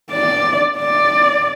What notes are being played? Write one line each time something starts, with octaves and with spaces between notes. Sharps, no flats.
D5
D5